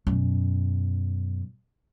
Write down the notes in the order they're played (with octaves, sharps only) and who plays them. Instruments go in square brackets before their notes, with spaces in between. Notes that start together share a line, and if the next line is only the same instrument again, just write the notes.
[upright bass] F#2 B2